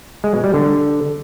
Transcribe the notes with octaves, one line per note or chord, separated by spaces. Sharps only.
G#3
B2
G3
D3